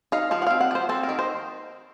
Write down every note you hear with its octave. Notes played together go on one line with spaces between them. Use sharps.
D#4 F5
F3 F5
F#5
C4 F5
F#5
F3 C5
C4 A4
A#4
D#3
C5